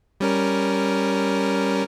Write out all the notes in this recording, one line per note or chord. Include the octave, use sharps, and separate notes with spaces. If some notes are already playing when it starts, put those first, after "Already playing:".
G3 C#4 A#4